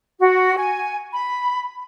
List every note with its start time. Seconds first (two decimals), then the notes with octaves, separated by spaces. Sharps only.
0.19 F#4
0.57 G#5
1.12 B5